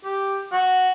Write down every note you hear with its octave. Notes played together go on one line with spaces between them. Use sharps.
G4
F#4